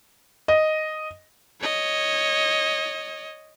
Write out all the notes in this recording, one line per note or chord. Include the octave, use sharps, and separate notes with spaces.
D#5
C#5 D#5